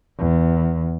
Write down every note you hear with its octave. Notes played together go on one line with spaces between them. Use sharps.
E2